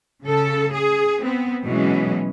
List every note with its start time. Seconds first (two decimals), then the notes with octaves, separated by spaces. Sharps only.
0.24 C#3 A4
0.73 G#4
1.22 B3 C4
1.65 B2 E3 F#3 G#3 C#4